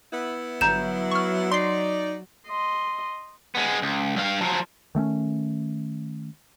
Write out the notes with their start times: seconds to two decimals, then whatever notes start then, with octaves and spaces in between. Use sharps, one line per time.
0.12 B3 E4
0.61 G1 F#3 A#5 G6 E7
1.11 C#6 F6
1.52 D#4 D5 C6 C7
2.48 D#5 C6
3.55 G#3 B3
3.82 C#2
4.16 G2 F5
4.41 F3 F#3
4.95 D#3 A3 C4 C#4